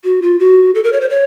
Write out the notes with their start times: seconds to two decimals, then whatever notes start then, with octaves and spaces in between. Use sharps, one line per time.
0.04 F#4
0.22 F4
0.39 F#4
0.75 A4
0.84 A#4
0.93 C#5
1.01 C5
1.10 C#5